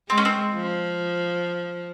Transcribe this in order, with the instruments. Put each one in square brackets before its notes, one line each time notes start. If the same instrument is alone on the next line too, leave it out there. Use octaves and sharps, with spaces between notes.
[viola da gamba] G#3 [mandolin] C4
[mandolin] C#4
C4
[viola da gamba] F3